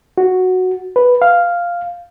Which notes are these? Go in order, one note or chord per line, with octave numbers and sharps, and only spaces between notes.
F#4
B4
F5